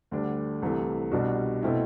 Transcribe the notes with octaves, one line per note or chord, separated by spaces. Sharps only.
D2 D3 G3 D4
C2 C3 E3 A3
C2 B2 G3 D4 F#4
B2 A3 C4 E4